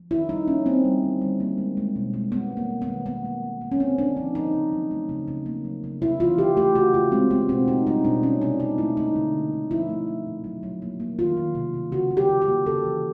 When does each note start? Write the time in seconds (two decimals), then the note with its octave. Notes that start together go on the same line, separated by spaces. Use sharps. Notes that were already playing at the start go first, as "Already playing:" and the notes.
Already playing: F3
0.11 D#3 E4
0.29 G3 D#4
0.47 A#3 C#4
0.66 A#3 C4
0.85 G3
1.03 D3
1.21 G3
1.40 A#3
1.58 G#3
1.77 G#3
1.96 B2
2.13 G#3
2.32 G#3 B3
2.51 G#3
2.57 A#3
2.70 G#3
2.82 B3
2.87 D#3
3.06 A#3 B3
3.25 A#3
3.43 A#3
3.61 A#3
3.72 C#4
3.80 D3 C4
3.98 D3 D4
4.17 F3 D#4
4.35 F3 D#4
4.54 C#3
4.72 F#3
4.91 A3
5.09 C#3
5.28 C#3
5.46 A#3
5.65 F#3
5.84 C#3
6.02 C3 E4
6.20 E3 F4
6.38 E3 G4
6.57 A3 G4
6.75 C#3 F#4
6.94 C#3 F4
7.12 G#3 C4
7.31 G#3 B3
7.49 B2 C4
7.68 A#3 D#4
7.86 G3 D#4
8.04 B2 D4
8.23 A3 C#4
8.41 C3 D4
8.60 C3 D#4
8.78 A3 E4
8.97 D3 D#4
9.16 D3
9.34 A#3
9.53 D3
9.71 F3 E4
9.89 A3
10.07 A3
10.26 A#2
10.44 F#3
10.63 F#3
10.82 A#3
11.00 A#3
11.19 D#3 F4
11.37 D#3
11.55 C3
11.74 C3
11.92 C#3 F#4
12.11 C#3
12.17 G4
12.29 C#3
12.42 G4
12.48 A#3
12.66 C#3 A4
12.84 E3